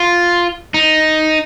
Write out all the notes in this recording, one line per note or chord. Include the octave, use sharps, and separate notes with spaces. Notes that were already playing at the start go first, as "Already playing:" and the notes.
Already playing: F4
D#4